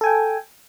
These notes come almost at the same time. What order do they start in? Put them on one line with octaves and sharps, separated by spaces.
A4 G#5 G5